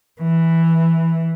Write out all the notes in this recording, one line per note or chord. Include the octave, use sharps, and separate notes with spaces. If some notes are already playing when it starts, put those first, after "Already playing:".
E3